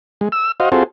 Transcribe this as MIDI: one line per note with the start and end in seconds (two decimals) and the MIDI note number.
0.21 0.29 56
0.32 0.52 88
0.60 0.69 66
0.60 0.69 72
0.60 0.69 75
0.60 0.69 77
0.72 0.83 60
0.72 0.83 65
0.72 0.83 66
0.72 0.83 68
0.72 0.83 69
0.72 0.83 72